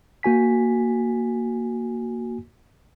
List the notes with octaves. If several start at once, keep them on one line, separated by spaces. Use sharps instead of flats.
A#3 F#4 G#5 B6